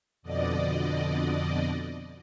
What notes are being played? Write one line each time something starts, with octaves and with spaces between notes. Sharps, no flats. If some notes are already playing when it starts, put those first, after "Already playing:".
F2 B2 D3 D5 D#5